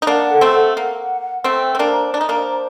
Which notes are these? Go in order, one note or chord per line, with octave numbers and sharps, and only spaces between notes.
D#4
A#3 D4 F#5
A4
A3 C4
F#5
A#3 F#5
F#5
F#5
A3 C4 G5
C5
C4
A#3 D4
A#5
D4 A#5
D#4
A#3 D4
C5